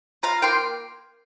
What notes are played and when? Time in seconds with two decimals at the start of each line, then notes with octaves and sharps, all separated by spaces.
0.23 F4 F5 A#5
0.42 A#3 G5 C6